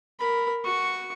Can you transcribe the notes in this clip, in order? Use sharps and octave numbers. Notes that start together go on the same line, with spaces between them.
A#4 B5
F#4 C#6